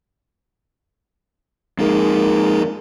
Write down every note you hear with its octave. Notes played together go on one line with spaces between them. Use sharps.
F2 G#3 A#3 D#4 G#4